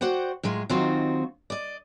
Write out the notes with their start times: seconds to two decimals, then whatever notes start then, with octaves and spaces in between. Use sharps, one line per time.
0.01 F#4 C5 D5 F#5 G5
0.43 A2 F#3 G#3 F4
0.69 D#3 F#3 C4 D#4 F4 F#4
1.50 D5 D#5